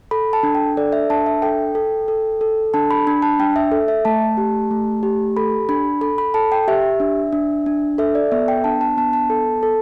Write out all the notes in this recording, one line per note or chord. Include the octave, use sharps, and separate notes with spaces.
A4 B5
A5
D4
G5
A4 D5
E5
D4 A5
E5
A4 G5
A4
A4
A4
D4 A5
B5
D4 B5
A5
D4 G5
E5
A4
E5
A3 A5
G4
A3
G4
A4 B5
D4 B5
A4 B5
B5
A4 A5
G5
G4 E5
D4
D4
D4
A4 E5
D5
B3 E5
G5
D4 A5
A5
B3 A5
A5
A4
A4